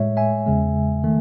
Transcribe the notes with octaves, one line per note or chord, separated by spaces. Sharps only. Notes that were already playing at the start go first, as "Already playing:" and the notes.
Already playing: A2 G#3 C#5 E5
E5 G#5
E2 C#3 G#3
D#3 A3